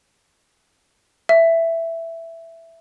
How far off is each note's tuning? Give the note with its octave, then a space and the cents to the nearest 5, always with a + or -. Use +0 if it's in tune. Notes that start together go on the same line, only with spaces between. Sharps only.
E5 +5